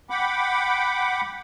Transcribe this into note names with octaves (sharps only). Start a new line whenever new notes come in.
F#5 G5 B5 D6